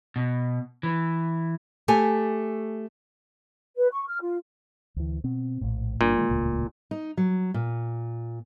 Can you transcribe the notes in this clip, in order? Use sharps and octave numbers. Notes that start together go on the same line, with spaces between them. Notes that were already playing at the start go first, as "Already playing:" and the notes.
B2
E3
A3 G4 A4 G#5
B4
C#6
F6
F4
D2 E3
B2 C4
A#1 A2
G1 G2 A#2 D4
D#3 G#3
D#1 C#2 A2
D#4
F#3
A#2